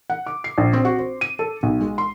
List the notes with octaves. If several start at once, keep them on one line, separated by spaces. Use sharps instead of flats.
F#5
D6
C7
A#1
C4
F#4
C5
D#7
A4
B1
G#3
C6